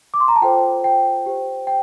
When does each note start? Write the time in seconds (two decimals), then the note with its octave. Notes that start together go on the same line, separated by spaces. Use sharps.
0.14 D6
0.20 C6
0.28 A#5
0.36 A5
0.42 F4 A4 C5 G5
0.84 G5
1.26 G4 C5
1.67 G5